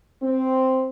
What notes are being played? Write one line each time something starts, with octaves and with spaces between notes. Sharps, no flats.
C4